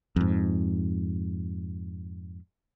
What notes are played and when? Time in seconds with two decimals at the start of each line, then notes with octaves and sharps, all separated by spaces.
0.16 F2 G#2